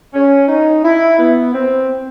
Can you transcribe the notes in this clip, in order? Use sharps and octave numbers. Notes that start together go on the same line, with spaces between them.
C#4
D#4
E4
B3
C4